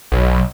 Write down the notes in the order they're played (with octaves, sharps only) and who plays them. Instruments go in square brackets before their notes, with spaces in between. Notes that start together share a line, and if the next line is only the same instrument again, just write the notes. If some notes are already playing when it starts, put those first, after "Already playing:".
[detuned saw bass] B1